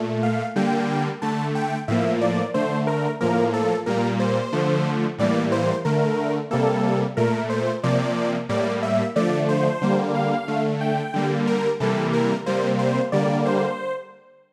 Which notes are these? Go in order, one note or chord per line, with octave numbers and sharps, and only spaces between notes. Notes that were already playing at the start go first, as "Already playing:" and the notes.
Already playing: A#2 A3
F5
D3 G3 A#3 G5
D3 A3 A5
G5
A2 F3 A#3 E5
D5
D3 A3 C5
A#4
A2 F3 A#3 A#4
A4
A#2 G3 A#3 A#4
C5
D3 F3 A3
A2 E3 G3 A#3 D5
C5
D3 A3 A#4
C3 G3 A#3 A4
A#2 A3 A#4
C5
C3 F3 A#3 D5
A2 G3 A#3 D5
E5
D3 F3 A3 D5
C5
D3 G3 A#3
F5
D3 A3
G5
D3 G3 A#3
A#4
C3 E3 G3 A#3 A4
A#4
C3 G3 A#3 C5
C5
D3 G3 A#3 D5
C5